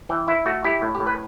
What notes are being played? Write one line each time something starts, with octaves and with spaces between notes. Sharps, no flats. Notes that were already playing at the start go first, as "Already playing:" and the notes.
E3 G5
E4 E5
A3 F#4
E4 G4
A2
G4
A2
B4